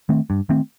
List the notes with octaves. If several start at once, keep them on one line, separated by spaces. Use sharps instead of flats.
D#3 A3 C4
G2
D#3 A3 C4